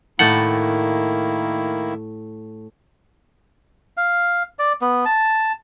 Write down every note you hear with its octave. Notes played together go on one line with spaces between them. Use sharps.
A2 D#3 A#3 E4 F#5 G5 A5
F5
D5
B3
A5